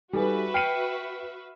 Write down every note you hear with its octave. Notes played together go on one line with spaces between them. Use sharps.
G3 D#4 F#4 A4 B4 E5 G#5
G5 F6 C7 C#7 D#7